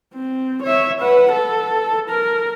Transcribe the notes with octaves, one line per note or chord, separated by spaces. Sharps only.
C4
C#5 E5
B4 F#5
A4
A#4